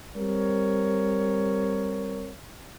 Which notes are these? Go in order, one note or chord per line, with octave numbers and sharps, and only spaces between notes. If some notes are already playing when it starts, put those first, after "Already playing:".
G3 C4 A#4 C#5